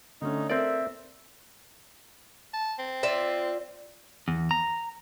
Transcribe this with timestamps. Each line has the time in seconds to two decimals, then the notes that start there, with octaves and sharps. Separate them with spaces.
0.22 D3 A3 C#4 D#4
0.50 C4 A4 A#4 C5 D5 E5
2.54 A5
2.79 C4
3.03 F4 D5 E5
4.28 E2
4.51 A#5